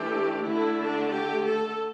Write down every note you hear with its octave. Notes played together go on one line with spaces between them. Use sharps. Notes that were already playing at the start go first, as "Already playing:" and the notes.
Already playing: E3 A3 D4 G4
D3 A3 D4 E4
D4
G4
A4